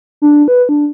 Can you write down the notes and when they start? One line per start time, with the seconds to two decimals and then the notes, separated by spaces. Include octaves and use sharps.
0.22 D4
0.48 B4
0.69 D4